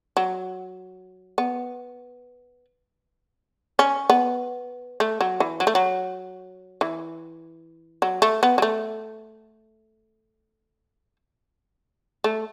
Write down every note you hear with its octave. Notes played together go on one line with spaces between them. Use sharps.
F#3
B3
C#4
B3
A3
F#3
E3
F#3
A3
F#3
E3
F#3
A3
B3
F#3
A3
A3